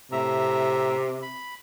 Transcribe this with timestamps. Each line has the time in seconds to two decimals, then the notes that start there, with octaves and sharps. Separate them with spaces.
0.12 A2 C3 E5 A#5
1.22 B5